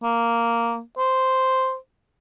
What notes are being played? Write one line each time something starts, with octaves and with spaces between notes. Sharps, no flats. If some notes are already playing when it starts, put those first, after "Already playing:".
A#3
C5